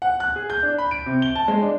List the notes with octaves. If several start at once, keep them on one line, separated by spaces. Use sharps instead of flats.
F#5
F#6
G#4
G6
D4
B5
D7
C3
G7
A5
G#3
D4